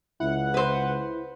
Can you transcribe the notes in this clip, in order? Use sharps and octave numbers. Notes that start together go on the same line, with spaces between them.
C#2 E4 F#5
B4 C5